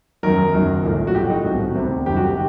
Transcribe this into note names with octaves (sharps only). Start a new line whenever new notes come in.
F#2 D#3 F#3 A#4
F#1 F#2 D#3 F#3
C2 A#2 A3
F#4
A#1 A2 F#3 A3 G4
D#4
C2 C3 D#3 F#3 F#4
D2 C3 D#3 G3
F#1 F#2 D#3 G3 G4
F#4
G4